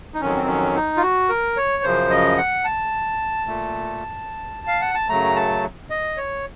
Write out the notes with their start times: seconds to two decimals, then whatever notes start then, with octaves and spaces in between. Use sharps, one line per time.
0.14 D#4
0.21 F2 D#3 F#3 C#4
0.36 C4
0.47 C#4
0.75 D#4
0.97 F4
1.02 F#4
1.29 A#4
1.57 C#5
1.83 F#2 C#3 F3 C5
2.11 D#5
2.38 F#5
2.64 A5
3.46 A#2 A3
4.67 F5
4.81 F#5
4.95 A5
5.09 F#2 C#3 F#3 A3 A#5
5.36 A5
5.90 D#5
6.17 C#5